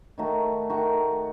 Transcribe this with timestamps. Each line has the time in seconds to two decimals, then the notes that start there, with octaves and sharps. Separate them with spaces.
0.18 D#3 A3 D#4 F#4
0.70 D#3 A3 D#4 F#4